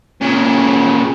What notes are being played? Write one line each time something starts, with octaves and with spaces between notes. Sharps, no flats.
A#2 C#3